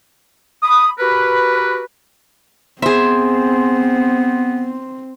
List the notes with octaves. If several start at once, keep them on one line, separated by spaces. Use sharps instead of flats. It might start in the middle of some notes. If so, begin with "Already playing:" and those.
B5 D#6
F#4 G4 A#4 B4
B3 C4 G#4 C5 E5